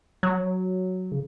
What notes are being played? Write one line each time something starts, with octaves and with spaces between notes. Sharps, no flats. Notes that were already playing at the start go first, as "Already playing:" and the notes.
F#3
C#3